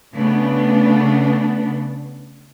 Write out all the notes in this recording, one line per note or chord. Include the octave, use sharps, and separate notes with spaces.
C#3 A3 B3 D4